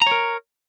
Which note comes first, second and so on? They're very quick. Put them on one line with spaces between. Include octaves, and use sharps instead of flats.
A#5 C#5 A#4